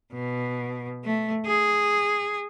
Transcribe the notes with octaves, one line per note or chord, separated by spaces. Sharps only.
B2
A3
G#4